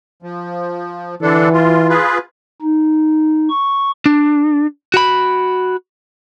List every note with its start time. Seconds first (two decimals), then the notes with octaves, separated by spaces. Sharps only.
0.22 F3
1.22 D3 E3 D4 A4
1.53 F4
1.89 F4 G#4 B4
2.62 D#4
3.50 C#6
4.06 D4
4.94 F#4 B5